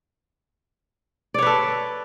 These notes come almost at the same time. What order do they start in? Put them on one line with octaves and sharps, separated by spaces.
D5 C#5 B4 A4